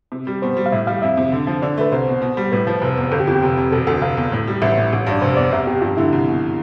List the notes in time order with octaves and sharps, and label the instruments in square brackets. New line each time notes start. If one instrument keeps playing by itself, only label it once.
[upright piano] C3
G3
[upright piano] B2 [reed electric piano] C5
[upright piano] G3
[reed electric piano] F5
[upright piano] A2 [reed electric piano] E5
[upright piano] G3 [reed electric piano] F5
[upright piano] F2 [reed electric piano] E5
[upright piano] C3
D3
F3
[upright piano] D3 [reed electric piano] D5
[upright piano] A3 [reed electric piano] B4
[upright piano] C2 [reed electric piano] C5
[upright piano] B2
B2
G3
[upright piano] A2 [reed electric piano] B4
[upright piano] F3
F1
E2
[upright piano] G1 [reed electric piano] A4
[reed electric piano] G4
[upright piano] F2 [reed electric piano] F4
[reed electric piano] G4
[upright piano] F1
F2
[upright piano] E1 [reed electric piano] A4
[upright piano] D2 [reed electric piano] A4
[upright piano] F1 [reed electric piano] F5
[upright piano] E2
A2
G3
[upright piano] A1 [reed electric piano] E5
[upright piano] A2
A1
[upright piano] G2 [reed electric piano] D5
[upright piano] F1 [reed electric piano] C5
[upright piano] E2 [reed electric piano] D5
[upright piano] C2 [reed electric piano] E5
[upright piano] B2 [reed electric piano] G4
[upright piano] G2 [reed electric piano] F4
[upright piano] D3 [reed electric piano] E4
[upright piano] C2
B2